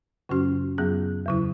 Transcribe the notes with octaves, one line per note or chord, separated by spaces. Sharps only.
F#2 C#3 F#3 C#4 F#4
F#2 F#3 B3 G#4
E2 C#3 F#3 E4